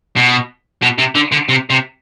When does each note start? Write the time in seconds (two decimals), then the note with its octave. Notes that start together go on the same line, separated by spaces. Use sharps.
0.16 B2
0.82 B2
0.98 C3
1.15 D3
1.32 D3
1.49 C3
1.70 C3